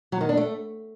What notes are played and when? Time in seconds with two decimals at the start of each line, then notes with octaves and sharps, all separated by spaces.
0.12 F#3
0.21 D#3
0.29 D4
0.37 A3